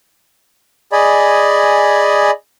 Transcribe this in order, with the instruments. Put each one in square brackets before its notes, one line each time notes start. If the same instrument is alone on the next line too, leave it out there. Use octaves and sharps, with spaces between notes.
[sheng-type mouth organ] G#4 D5 D#5 G#5 B5